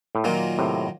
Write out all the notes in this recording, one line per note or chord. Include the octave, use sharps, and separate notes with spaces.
A2
A#2 D#3 F#3 A#3 F4
A2 C3